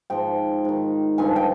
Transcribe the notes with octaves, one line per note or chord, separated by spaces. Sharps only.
G#2 F3 G5
G#2 D#3
G2 D3 F3 G#5
G5